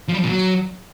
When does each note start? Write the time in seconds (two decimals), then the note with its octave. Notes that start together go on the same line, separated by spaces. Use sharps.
0.08 F3
0.13 G3
0.19 F3
0.24 A#2
0.29 F#3